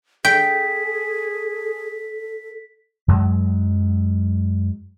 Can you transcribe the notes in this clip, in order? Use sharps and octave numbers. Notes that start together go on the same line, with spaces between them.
G#4 A4 G5 B6
F#2 F#3 G#3